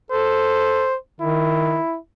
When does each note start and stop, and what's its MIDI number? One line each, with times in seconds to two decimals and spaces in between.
0.11 0.92 69
0.11 0.96 72
1.21 1.78 51
1.21 1.97 64